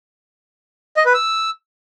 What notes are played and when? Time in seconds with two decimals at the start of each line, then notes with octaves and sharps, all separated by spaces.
0.97 D#5
1.05 B4
1.14 E6